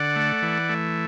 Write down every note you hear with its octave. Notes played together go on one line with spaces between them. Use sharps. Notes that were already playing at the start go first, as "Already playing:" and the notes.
Already playing: D3 D5 F#5
A3
E3
A3